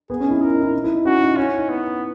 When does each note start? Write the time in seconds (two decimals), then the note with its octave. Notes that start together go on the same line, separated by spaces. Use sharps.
0.10 B3 G#4
0.20 C#4
0.26 D#4
0.31 E4
0.42 E4 A#4
0.53 D#4
0.63 E4
0.74 D#4
0.84 E4
0.95 D#4
1.05 C#4 F#4
1.21 D#4
1.37 C#4 E4
1.58 D#4
1.69 B3